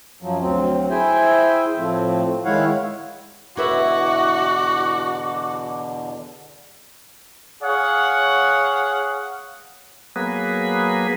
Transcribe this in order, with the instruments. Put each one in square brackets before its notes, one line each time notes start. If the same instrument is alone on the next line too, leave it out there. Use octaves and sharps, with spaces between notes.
[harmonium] F#2 F3 F#3
D2 F#3 C4
E4 G#4 C5 E5 G5 G#5
A2 F3 A3 C4
D#3 G#3 E4 C#5 F5 F#5
[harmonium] E2 B2 D3 [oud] E4 B4 E5 [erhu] F#4 [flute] D6
[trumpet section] G#4 C#5 F5 F#5
[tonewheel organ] F#3 A#3 B3 G#4 B4